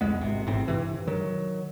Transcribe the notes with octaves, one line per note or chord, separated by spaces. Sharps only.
C2 F2 G#3 B3
G#1 C3
A1 G#2 C4
G2 C3 E3
D#3 F#3